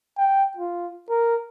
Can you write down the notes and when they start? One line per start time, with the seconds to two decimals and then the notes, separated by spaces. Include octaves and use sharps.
0.18 G5
0.57 F4
1.10 A#4